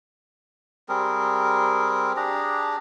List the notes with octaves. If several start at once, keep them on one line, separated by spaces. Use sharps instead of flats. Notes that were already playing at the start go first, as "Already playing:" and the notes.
G3 C4 G#4 A#4
D4 G4 G#4 A#5